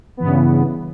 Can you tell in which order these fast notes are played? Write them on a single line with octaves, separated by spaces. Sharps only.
B3 E3 G2 C#3